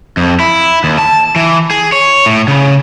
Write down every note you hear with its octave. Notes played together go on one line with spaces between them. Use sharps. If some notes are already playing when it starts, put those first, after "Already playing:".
F2
E4
D#2
A5
E3
G#4
C#5
A2
C#3